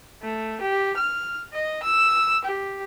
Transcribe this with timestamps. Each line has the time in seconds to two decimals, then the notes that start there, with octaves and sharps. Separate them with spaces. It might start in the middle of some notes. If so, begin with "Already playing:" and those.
0.23 A3
0.61 G4
0.97 F6
1.53 D#5
1.83 E6
2.44 G4